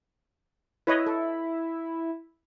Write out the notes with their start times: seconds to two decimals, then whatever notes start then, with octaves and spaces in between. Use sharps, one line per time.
0.87 E4 B4 C#5 D#5
1.07 A4